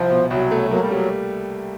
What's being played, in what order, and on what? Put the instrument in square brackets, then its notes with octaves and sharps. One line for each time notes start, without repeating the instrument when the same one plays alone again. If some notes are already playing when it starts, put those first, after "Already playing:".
Already playing: [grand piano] C2 [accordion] F3
[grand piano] B2
[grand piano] C2 [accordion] F#3
[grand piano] A3
[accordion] F#3 [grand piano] A#3
[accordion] G3
[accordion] F#3 [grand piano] G3